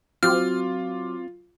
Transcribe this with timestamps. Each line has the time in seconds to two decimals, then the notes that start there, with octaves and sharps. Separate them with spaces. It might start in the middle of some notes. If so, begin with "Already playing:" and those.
0.23 F#3 C4 F4 D6 F6